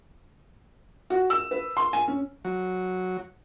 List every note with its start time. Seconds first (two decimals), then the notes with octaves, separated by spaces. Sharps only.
1.10 F#4
1.30 E6
1.51 B4
1.77 C6
1.93 G#5
2.08 C#4
2.45 F#3